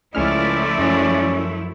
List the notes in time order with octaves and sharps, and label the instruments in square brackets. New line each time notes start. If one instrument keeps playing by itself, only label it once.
[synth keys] C#2 C#4 F6 [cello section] F3 A3 E4 [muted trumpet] D5
[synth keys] F#2 [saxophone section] C#4